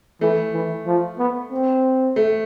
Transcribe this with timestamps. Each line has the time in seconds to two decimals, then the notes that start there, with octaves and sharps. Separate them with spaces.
0.21 E3 A3
0.53 E3
0.86 F3
1.18 B3
1.52 C4
2.16 A3